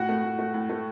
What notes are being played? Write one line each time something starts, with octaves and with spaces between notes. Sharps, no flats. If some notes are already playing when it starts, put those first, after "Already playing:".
Already playing: A2 F#4 F#5
A3
A2
A3
A2
A3